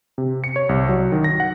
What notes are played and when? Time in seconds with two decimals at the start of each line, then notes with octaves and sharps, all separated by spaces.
0.18 C3
0.44 C#7
0.56 C#5
0.69 C2
0.89 F#3
1.12 D#3
1.24 A#6
1.40 F#5